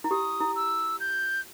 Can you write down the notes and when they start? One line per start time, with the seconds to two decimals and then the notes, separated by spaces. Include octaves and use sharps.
0.04 E4
0.11 G4 D#6
0.41 E4
0.56 E6
1.00 G6